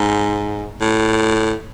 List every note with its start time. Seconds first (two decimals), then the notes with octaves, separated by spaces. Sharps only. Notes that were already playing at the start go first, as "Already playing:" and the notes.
Already playing: G#2
0.81 A2